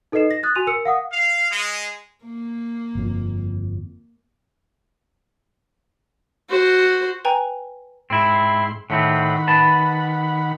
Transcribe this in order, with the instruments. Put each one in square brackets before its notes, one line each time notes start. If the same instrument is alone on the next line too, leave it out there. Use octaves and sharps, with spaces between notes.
[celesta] D#4 A4 B4 D#5 C7 E7
A#6
D#6 F#6 A6
F#4 G#5 C6 D#7 F7
A#4 E6 C#7
F5 F#5 D#6
[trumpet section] F5
G#3
[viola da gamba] A#3
[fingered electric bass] G1 F2
[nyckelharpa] F#4 C5
[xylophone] B4 G5 G#5 A#5
[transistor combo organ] G#2 C6 [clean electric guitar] C4 E4
[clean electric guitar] A2 A3 C4 [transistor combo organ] D#3 F#5 B5
[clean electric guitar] B4 A5